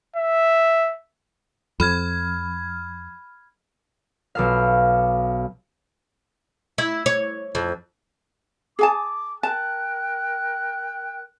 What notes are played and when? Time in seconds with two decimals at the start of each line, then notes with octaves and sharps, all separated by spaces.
0.16 E5
1.80 F2 B5 F6 G#6
4.35 B1 A4 F5
6.78 E4
7.06 C#5
7.55 F2
8.79 G#4 G#5 A5 D6
9.43 A#4 G5 A5 F#6